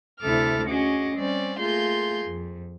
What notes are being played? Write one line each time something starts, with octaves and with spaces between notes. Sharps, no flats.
D2 C3 E4 A4 D6 F6
C#4 F#4 G#4 D#5 D6
G3 C4 C#4 D5
A3 A#3 F4 G#4 C6 G6
F2